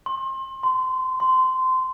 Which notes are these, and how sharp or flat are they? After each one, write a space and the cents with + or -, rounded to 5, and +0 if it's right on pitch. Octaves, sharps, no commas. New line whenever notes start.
C6 +30
C6 -25
C6 -20